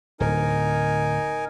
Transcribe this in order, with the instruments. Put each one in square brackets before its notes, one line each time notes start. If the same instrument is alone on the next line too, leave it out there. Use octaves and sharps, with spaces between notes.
[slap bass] D1 [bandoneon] D#4 A#4 G#5